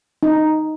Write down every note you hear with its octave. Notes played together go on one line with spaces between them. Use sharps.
D#4